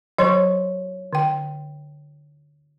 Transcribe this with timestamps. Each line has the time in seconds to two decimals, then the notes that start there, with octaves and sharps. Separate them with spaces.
0.19 F#3 C5 C#5 C6 C#6
1.13 D3 G5